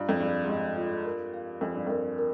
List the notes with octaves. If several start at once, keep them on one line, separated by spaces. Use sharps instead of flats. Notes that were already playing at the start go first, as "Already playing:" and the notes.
Already playing: G2 F4 D#5 A#5
F2
G2 G#4
G#2
G2 D#5
F4
A#4
F5
F2 G#5
G2
F2 A#4
A#4